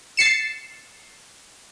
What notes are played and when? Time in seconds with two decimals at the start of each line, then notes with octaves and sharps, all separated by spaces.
0.17 A6 C7 C#7 E7